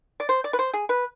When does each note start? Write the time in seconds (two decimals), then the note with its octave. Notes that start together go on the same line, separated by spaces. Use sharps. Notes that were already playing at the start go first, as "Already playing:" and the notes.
0.20 D5
0.29 C5
0.44 D5
0.53 B4
0.59 C5
0.73 G#4
0.89 B4